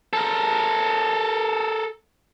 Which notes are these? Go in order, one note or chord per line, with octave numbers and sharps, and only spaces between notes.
A4 A#4